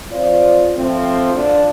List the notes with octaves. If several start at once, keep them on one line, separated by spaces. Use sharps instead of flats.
F2 F4 C5 D5
F3 A3 C4
D3 D4 F4